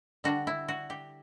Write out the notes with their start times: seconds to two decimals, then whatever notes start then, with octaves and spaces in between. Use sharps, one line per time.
0.24 D3 G3 D4 F#4
0.47 E4
0.68 F#4
0.90 G4